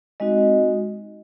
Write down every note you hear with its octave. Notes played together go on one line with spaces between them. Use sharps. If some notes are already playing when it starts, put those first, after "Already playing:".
G#3 C4 D#4 F#4 D#5